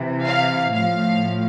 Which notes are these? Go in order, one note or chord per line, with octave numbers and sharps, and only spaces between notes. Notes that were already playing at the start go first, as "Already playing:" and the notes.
Already playing: C3 E3
F5
A2 F3 F5